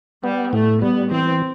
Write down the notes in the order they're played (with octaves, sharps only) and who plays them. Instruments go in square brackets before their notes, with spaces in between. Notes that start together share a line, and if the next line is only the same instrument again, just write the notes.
[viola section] G3 [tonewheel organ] B3
[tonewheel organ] A2 [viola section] A3
[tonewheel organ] G3 [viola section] B3
[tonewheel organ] E3 [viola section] C4